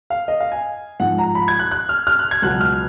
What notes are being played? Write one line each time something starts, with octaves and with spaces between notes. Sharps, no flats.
F5
D#5
F5
G#5
G#2 F3 F#5
A#5
B5
G#6
F#6
F#6
F6
F6
F#6
G#6
C#2 B2 F#3 F#6
F6